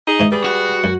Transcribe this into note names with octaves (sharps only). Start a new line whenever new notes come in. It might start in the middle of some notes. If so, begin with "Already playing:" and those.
D#4 G#4 D#5
G#2 E3
G3 G#4 B4
F#4 F#5
F#2